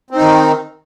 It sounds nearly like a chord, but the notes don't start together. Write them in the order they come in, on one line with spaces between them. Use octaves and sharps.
C4 D#4 D#3